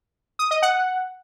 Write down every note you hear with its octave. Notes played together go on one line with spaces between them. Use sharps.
D#6
D#5
F#5